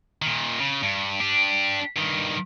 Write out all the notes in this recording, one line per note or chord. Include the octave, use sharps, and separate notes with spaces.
A#2 D#3
C#3
G2
D4 G4
G2 D#3